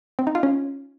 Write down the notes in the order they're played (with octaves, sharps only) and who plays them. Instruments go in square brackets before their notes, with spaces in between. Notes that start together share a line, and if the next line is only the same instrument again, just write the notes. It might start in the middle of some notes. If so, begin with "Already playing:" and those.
[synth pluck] C4
D#4
F4
C#4